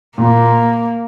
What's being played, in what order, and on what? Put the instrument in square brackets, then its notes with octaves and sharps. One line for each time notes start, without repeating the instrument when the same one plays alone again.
[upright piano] A#2 [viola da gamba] A#3